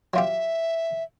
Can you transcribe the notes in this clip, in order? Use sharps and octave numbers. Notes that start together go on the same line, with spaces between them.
F#3 F4 G4 E5